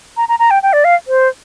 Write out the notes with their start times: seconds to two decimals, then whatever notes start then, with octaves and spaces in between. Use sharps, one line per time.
0.17 A#5
0.29 A#5
0.39 A#5
0.51 G5
0.63 G5
0.73 D5
0.84 F5
1.08 C5